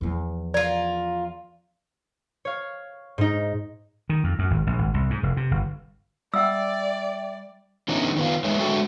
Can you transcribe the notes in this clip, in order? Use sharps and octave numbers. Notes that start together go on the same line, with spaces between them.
E2 F3
F4 A#4 D5
C#5 F5
G#2 D#4
D#3
F2
F#2
G#1
A#1
G#1
C2
G#2
F1
C3
G1
G3 D5 E5 F#5 G5 E6
D3 E3 B3 C#4 D#4 E4
D#3 B3 F4
E2 G#3 D#4 B4 C#5 E5
D3 G#3 F#4 A4 E5 G5